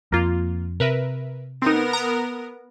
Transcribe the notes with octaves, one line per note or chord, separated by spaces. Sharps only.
F2 A#3 F4
C3 A#4 B4 E5
B3 C4 D#4 A#4
A#5 D#6